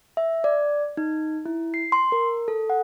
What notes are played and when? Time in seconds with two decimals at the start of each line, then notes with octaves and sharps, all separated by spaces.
0.17 E5
0.44 D5
0.97 D#4
1.46 E4
1.74 C7
1.92 C6
2.12 A#4
2.48 A4
2.70 F#5